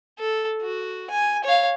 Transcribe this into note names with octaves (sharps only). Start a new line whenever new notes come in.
A4
F#4
G#5
C#5 F5